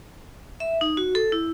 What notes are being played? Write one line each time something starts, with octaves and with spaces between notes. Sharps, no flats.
E5
D#4
F#4
A4
E4